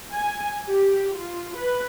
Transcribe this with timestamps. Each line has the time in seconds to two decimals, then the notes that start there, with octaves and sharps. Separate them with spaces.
0.12 G#5
0.67 G4
1.16 F4
1.56 B4